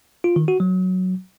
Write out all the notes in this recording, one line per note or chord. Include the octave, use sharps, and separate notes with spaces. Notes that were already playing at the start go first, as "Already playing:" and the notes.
F4
D#3
F#4
F#3